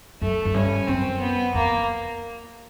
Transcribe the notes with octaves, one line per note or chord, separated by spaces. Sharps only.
F#2 A3
F#2
G2 C#4
F#2 C4
B3
F2 A#3